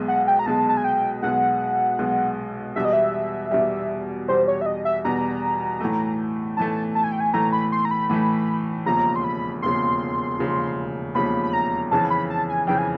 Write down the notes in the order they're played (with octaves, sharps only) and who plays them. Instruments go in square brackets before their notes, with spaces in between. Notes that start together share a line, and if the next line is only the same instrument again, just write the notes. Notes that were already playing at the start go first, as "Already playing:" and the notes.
Already playing: [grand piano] B1 B2 G#3
[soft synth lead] F#5
G5
A#5
[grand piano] B1 B2 G#3 [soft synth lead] A5
[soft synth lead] A5
G#5
G5
[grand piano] B1 B2 G#3 [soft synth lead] F#5
[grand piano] B1 B2 G#3
[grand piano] E2 B2 G3 [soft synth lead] E5
[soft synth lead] D#5
E5
[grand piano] E2 B2 G3
[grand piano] E2 B2 G3 [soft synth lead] C5
[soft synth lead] C#5
E5
D#5
E5
[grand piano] E2 B2 G3 [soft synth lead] A#5
[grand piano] A2 E3 A3
[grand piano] A2 E3 A3 [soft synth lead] A5
[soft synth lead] A5
G#5
G5
G#5
[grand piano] A2 E3 A3 [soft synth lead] A#5
[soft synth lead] B5
C6
A#5
B5
[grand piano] A2 E3 A3
[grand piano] E1 D#2 C#3 F3 [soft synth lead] A#5
[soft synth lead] C6
B5
[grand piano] E1 D#2 C#3 F3 [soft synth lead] C6
[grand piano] E1 D#2 C#3 F3
[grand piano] E1 D#2 C#3 F3 [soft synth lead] B5
[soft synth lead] B5
A#5
[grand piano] F2 C#3 E3 [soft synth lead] A5
[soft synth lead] B5
A5
G#5
[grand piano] F2 C#3 E3 [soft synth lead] G5
[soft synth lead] G#5